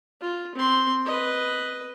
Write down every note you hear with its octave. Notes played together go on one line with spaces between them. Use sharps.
F4
C4 C6
B4 D#5